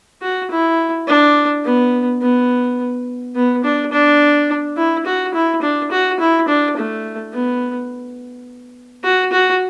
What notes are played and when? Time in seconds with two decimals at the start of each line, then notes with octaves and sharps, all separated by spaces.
0.22 F#4
0.51 E4
1.08 D4
1.65 B3
2.21 B3
3.35 B3
3.64 D4
3.92 D4
4.77 E4
5.06 F#4
5.34 E4
5.62 D4
5.91 F#4
6.20 E4
6.48 D4
6.77 A3
7.33 B3
9.04 F#4
9.32 F#4